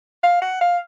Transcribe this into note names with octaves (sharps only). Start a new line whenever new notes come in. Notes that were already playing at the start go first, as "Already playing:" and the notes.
F5
F#5
F5